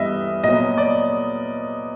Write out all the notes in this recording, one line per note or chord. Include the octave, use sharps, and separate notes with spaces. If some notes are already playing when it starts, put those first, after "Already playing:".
Already playing: G2 E3 G3 B3 D#5 E5
A#2 F#3 B3 D#5
D5